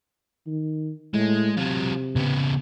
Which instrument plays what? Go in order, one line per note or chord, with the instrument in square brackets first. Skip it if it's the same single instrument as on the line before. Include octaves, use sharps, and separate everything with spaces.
[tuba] D#3
[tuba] A2 [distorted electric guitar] G#3
[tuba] C3 [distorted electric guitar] F#3 F4
[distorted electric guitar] C#3 B3